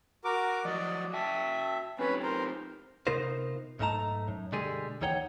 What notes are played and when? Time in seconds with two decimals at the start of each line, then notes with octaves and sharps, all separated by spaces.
0.25 F#4 A#4 D6
0.65 F3 F#3 F#4 D5 D#5
1.13 F#4 E5 G5 A5
1.99 C4 C#4 D#4 G4 B4
2.23 A#4 C5
3.07 C3 B3 D#4 F4 A#4 C5
3.79 B1 G#2 A3 D#4 A5 A#5
4.28 F#2
4.52 B2 D3 G3 G#3 G#4
5.01 D#2 E3 D#4 C#5 F#5 G5